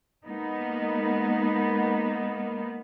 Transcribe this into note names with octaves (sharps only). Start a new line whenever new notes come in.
G#3 A#3 B3 D#4